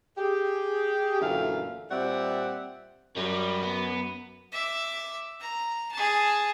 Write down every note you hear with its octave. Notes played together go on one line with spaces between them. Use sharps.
G4 G#4
F#2 A#2 D3 E3 A3 F5
A#2 G3 C4 D5 E5 F#5
F#2 G3
B3
E5 D6
A#5
G#4 A5